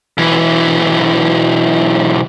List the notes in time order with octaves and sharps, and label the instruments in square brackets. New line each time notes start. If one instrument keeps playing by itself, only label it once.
[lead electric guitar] B1 E3